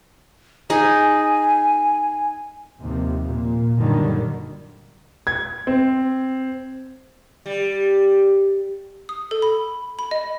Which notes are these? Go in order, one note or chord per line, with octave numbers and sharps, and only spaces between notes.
D#4 G#4 G#5
D#2 C3 F3
A#2
F#2 A#2 D3 D#3 F#3 G3
G#6
C4
G3
D#6
A4
B5
B5
D#5